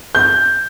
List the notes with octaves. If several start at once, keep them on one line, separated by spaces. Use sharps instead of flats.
G6